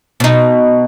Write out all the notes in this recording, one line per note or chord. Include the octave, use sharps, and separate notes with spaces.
B2 D#4